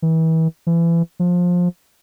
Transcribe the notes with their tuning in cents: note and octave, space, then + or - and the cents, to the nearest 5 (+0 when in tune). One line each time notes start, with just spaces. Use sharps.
E3 -35
E3 +30
F3 +20